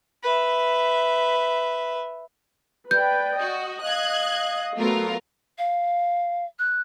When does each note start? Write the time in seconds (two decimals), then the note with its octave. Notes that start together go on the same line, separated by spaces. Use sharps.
0.23 B4 E5
2.91 B4 D5 G5 G6
3.40 F#4 D#5
3.82 F5 F#6 G#6
4.79 F#3 A3 B3 F4 A#4 F5
5.58 F5
6.59 F#6